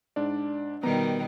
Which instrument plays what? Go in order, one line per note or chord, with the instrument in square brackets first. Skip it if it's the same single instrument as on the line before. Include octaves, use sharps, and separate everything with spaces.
[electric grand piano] G#2 D4 D5
[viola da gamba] B2 D#3 G3 [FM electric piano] B3 [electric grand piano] A#5